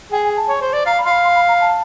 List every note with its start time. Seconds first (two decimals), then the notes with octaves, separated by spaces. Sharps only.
0.12 G#4 G5
0.24 G#5
0.37 A5
0.49 C#5
0.62 C5
0.73 D5
0.86 F5 A#5
0.98 B5
1.05 F5 C6
1.11 B5
1.24 C6
1.36 B5
1.48 A#5
1.61 A5